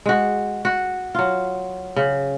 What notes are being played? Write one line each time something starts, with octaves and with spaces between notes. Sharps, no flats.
G#3 F#4
F#4
F#3 F4
C#3